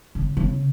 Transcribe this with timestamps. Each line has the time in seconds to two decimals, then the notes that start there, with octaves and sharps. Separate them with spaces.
0.15 C#3
0.37 C#3